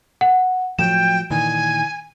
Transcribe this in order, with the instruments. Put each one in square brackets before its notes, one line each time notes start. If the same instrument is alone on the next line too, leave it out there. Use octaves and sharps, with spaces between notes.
[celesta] F#5
[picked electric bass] A2 F3 F#3 [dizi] G5 [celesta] E7
[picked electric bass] A#2 D#3 E3 [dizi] G#5